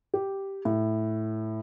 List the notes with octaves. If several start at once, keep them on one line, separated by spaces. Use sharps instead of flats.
G4
A2